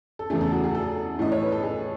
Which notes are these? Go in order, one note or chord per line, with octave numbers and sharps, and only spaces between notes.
A4
E2 C#3 E3 A3 G#4
A4
F#4
G#4
A4
A2 E3 A3 D#5
C#5
B4
A4
G#4